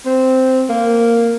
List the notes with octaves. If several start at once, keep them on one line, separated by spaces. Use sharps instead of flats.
C4
A#3